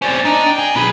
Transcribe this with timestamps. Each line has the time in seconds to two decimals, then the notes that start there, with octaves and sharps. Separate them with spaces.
0.02 C4 C#4 C5 D5
0.25 D4 D#4
0.47 G5
0.59 G#4
0.76 B1 G#4 B4